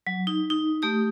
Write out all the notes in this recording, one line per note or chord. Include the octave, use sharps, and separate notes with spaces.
F#3
D#4
D#4
A3 G4 D#6